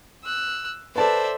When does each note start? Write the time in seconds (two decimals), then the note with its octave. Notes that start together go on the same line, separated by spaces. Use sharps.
0.24 E6 F#6
0.96 A4 B4 C5 D5 E5 A5